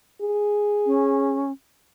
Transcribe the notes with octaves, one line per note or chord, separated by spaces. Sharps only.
G#4
C#4